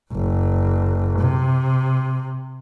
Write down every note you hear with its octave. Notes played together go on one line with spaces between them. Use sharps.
F#1
C3